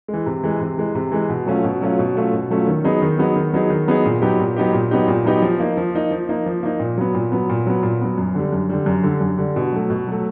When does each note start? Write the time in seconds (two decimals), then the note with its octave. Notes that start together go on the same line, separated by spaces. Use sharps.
0.08 G#3
0.14 E3
0.26 C3
0.44 E3 G#3
0.60 C3
0.78 E3 G#3
0.95 C3
1.12 E3 G#3
1.30 B2
1.46 F#3 A3 C#4 F4
1.64 B2
1.82 F#3 A3 C#4 F4
1.99 B2
2.15 F#3 A3 C#4 F4
2.33 B2
2.51 F#3 A3 C#4 F4
2.68 D#3
2.84 F#3 B3 D#4 G#4
3.02 D#3
3.19 F#3 B3 D#4 G#4
3.36 D#3
3.53 F#3 B3 D#4 G#4
3.70 D#3
3.87 F#3 B3 D#4 G#4
4.05 A#2
4.22 F#3 B3 D#4 G4
4.39 A#2
4.56 F#3 B3 D#4 G4
4.73 A#2
4.91 F#3 B3 D#4 G4
5.08 A#2
5.25 F#3 B3 D#4 G4
5.42 F3
5.60 A#3 D#4
5.77 F3
5.94 A#3 D#4
6.11 F3
6.29 A#3 D#4
6.46 F3
6.63 A#3 D#4
6.80 A#2
6.98 F#3 B3
7.15 A#2
7.32 F#3 B3
7.50 A#2
7.67 F#3 B3
7.83 A#2
8.01 F#3 B3
8.18 F#2
8.35 D3 G3
8.52 F#2
8.69 D3 G3
8.86 F#2
9.03 D3 G3
9.21 F#2
9.38 D3 G3
9.56 B2
9.73 F#3 A3
9.90 B2
10.08 F#3 A3